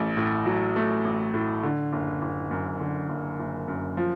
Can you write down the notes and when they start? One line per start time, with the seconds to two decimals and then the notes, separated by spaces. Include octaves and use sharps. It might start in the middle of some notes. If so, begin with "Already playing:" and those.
Already playing: A1 A3
0.17 A2
0.46 F#3
0.76 A3
1.05 A1
1.34 A2
1.63 D3
1.93 F#1
2.22 F#1
2.51 F#2
2.80 D3
3.09 F#1
3.39 F#1
3.68 F#2
3.97 F3